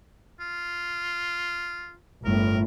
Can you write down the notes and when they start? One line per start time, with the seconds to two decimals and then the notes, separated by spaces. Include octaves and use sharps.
0.40 F4
2.25 G1 A2 A#4